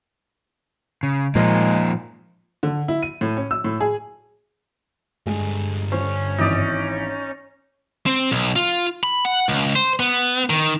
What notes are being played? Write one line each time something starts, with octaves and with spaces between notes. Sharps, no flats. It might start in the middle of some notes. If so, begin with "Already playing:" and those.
C#3
A#2 F3 G#3 A#3 D#4 F4
D3
E4
D#7
A2
C#4
E6
A2
G#4
G2 D3 G#3
G1 C#4 C5
G#1 E3 D#4 D5
C4
B1
F4
B5
F#5
C#2
C5
B3
D#3